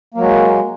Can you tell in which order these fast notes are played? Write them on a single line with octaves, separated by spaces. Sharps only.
A#3 F#3 G#3